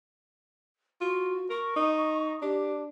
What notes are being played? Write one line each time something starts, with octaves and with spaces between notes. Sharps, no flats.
F4 F#4
A#4 C#6
D#4
D4 G4